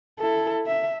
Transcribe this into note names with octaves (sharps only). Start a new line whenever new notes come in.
E4 A4
E5